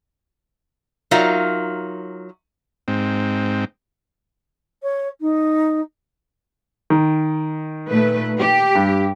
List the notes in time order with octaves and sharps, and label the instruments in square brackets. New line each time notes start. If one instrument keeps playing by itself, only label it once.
[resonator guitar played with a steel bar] F#3 D#4 F4 A#4 E5 F5
[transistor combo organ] G#2 C4
[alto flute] C#5
D#4
[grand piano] D#3
[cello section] A#2 A3 B4
G4
[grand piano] G2